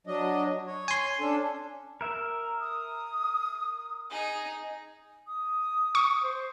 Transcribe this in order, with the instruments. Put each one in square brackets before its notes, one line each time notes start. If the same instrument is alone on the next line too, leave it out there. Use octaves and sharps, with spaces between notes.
[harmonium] F#3 D4 D#5
C#5
[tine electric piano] G#5 C6
[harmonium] C#4 D4 A4
[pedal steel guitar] A#4 E5
[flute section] D#6
[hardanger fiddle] D#4 G#4
[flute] D#6
[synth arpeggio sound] C#6
[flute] C5